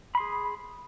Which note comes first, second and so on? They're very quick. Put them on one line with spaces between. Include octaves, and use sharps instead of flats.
B5 C6 G#4